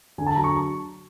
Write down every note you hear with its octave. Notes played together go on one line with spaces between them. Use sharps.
D3 G#5
A5
F#3 A#5
C#6